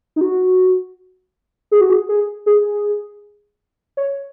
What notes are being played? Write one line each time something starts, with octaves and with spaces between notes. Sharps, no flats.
D#4
F#4
G#4
F#4
G#4
G#4
G#4
C#5